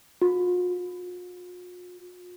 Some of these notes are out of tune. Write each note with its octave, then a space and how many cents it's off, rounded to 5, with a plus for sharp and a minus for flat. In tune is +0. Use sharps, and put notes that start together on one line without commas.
F4 +45